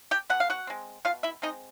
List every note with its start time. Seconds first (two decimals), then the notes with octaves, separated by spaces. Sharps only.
0.11 G4 G5
0.30 B2 F#5
0.40 F5
0.50 F#4 F#5
0.67 G#3 C4
1.05 B2 F4 F5
1.23 E4 E5
1.42 G#3 C4 D#4 D#5